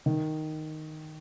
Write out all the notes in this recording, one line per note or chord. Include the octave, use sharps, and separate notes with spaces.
D#3